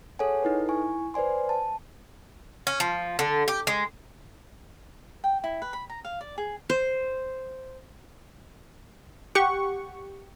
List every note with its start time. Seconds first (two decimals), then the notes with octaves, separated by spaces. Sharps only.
0.19 G#4 A4 C#5 F#5 G#5
0.42 D#4 E4 A4 B4
0.69 E4 G#5 C#6
1.14 B4 C5 D5 G#5 C6
1.49 A5
2.67 C#4
2.80 F3
3.19 D3
3.48 G4
3.67 G#3
5.24 G5
5.44 E4
5.62 B4
5.73 B5
5.90 A#5
6.05 F5
6.21 D5
6.38 G#4
6.70 C5
9.35 G4 F#5 C#6